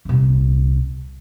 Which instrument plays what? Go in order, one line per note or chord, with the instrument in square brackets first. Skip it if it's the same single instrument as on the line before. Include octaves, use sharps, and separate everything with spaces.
[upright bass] D#1 C2